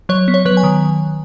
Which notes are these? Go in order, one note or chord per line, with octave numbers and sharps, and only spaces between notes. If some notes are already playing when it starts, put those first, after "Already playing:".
F#3 C#5
B3
C#5
F#3 B4
G#5
D#3